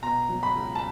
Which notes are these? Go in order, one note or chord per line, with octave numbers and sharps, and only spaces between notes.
B2 A#5
F#3
B5
C#2
A5